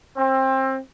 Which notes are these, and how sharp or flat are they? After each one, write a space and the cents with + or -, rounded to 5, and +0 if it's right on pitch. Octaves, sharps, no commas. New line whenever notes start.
C4 +25